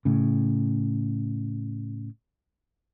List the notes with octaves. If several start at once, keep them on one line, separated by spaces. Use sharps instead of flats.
A2 C#3